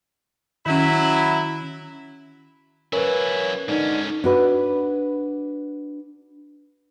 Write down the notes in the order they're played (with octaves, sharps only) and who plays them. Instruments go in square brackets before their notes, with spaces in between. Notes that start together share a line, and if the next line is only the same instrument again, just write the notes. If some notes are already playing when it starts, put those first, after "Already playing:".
[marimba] D#3 C#4 [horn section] F#3 E4
[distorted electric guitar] F#3 E4 [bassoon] C#4 [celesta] A#4 B4
[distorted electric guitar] G#2 C#4 [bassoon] D3 [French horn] D#4
[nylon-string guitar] D4 F#4 B4